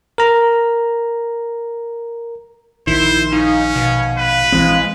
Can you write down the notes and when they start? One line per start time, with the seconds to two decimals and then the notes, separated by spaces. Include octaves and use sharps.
0.18 A#4 A#5
2.87 A#1 D#3 E4 C5
3.32 C#4 D#4 F5
3.75 B2
4.18 B4
4.52 A#1 E3 G#3 C4